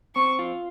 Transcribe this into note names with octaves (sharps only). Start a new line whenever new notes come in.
C4 C#6
F4